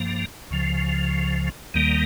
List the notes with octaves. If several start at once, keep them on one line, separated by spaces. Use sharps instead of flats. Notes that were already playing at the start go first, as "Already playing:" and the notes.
Already playing: G2 F3 A#3
C#2 C#3 F3
D#2 D#3 G3 A#3